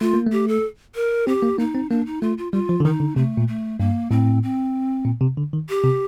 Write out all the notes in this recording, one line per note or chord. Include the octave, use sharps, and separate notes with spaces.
A3 F4
A#3
A3
G4
A4
A#4
C4 G4
A#3
A#3 D#4
C4
A#3 D4
D#4
A3 F4
F4
G3 F4
F3
D3
D#3 D#4
D3
C3 A3
A#2
A3
G2 A#3
A2 C4
C4
A#2
C3
D3
D#3
G4
C3